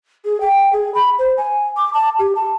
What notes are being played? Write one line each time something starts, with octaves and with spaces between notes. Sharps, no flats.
G#4
G5
G#4
B5
C5
G#5
D6
A5
G4
A5